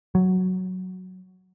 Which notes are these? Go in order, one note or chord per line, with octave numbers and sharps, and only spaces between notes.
F#3